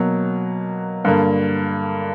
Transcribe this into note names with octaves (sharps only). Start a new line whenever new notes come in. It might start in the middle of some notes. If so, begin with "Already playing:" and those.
Already playing: B2 F#3 A#3
G2 D3 A#3